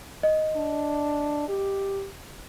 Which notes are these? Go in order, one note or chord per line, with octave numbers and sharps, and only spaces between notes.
D#5
D4
G4